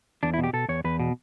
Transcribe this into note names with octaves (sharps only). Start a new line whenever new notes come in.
E2 D4
E4
B2
G4
B2 A4
E2 C#5
E2 B4
B2